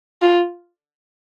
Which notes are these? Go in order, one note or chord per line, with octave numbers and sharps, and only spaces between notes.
F4